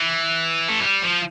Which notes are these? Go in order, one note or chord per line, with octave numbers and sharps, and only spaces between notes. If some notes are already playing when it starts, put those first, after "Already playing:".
Already playing: E3
A3
G3
F3